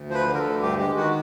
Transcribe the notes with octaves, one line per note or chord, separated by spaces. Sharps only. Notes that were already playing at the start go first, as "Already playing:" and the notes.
Already playing: D2
F3 C5
B4
D3
A#4
A4
D2
G2 G4
G#3 G4
D#3 F#4